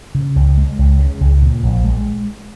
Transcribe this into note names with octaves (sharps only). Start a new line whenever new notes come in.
C#3
C#2
G#3
C#2
C#3
C#2
A#2
A#1
G#3